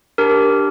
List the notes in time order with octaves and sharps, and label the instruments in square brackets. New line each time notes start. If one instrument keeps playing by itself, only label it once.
[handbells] D4 G4 A#4